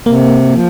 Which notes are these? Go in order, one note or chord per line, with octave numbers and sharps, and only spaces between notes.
C3 A#3
F3